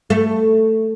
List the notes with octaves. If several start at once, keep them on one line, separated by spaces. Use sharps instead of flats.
A3